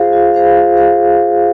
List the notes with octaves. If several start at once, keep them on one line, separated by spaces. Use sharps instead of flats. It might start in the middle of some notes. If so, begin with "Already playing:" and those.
Already playing: F4 G#4 C5 F5
F4
G#4 C5 F5
F4
G#4 C5 F5